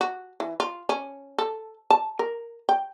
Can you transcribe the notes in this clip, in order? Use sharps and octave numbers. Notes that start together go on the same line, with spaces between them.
F#4
E3
F4
C#4
A4
A5
A#4
G5